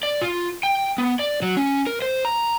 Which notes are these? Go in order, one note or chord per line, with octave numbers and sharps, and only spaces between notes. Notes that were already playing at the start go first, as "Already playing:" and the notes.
D5
F4
G5
B3
D5
F#3
C#4
A#4
C5
A#5